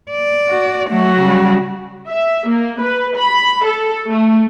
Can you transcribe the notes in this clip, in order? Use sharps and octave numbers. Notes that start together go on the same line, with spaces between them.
D5
F#4
F#3 A3 F#4
C#3 G3
E5
A#3
B4
B5
A4
A3